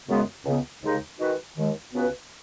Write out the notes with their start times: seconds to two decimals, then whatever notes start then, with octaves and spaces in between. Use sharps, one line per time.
0.08 F#2 C#3 G#3 B3
0.45 C#2 C#3 B3
0.83 D#2 C#3 G#3 D#4
1.19 D#3 G#3 D#4 F#4 B4
1.57 D#2 D#3 G#3
1.94 C#2 C#3 B3 F#4 B4